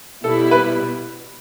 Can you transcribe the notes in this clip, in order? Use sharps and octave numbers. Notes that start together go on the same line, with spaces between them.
B2 G3 B3 E4 A4
B4